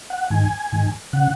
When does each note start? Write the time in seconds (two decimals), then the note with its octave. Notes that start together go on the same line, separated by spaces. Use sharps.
0.10 F#5
0.30 G#2 D#3 G#5
0.72 G#2 D#3
1.13 C#3 F#5